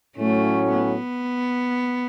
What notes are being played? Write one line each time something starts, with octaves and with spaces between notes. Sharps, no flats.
A2 F#3 A3 C#4
B3